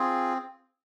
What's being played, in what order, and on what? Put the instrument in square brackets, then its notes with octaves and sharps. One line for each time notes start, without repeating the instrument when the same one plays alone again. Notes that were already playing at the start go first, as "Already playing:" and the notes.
Already playing: [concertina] C4 F4 G#4